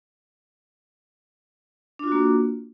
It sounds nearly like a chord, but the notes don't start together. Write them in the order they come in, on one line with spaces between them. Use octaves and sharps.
D4 F4 F#4 A#3